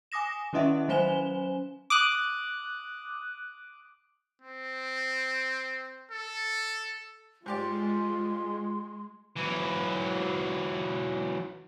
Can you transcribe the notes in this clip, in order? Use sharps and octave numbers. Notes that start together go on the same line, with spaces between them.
G#5 D6 D#6 A#6 E7
D#3 C#4 E4 D#5 E5 F#5
F#3 C#4 C5 G#5 E7 G7
D6 D#6 F#6
C4
A4
G#2 G#3 F4 G4 D5 C6
E3 F#3